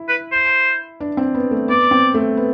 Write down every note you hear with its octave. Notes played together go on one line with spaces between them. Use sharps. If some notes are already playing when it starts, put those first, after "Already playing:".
Already playing: E4
B4
C5
D4
C4
B3
A3
B3 D5
C4
A3
B3